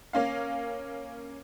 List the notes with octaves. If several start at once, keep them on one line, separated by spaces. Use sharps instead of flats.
A#3 C#4 F5